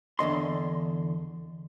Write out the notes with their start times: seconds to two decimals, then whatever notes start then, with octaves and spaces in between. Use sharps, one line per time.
0.19 E2 D3 D#5 C6